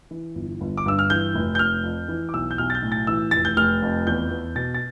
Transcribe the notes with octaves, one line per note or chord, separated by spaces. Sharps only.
E3
G1
G1
D6
G2 E6
F6
E3 G6
F1
G6
F1 F6
F2
E3
D6
B1 E6
G6
B1 F6
A6
G6
A2
A6
E3 E6
F1 A6
G6
F1 F6
F2
E2 G6
E2
B2 A6
A6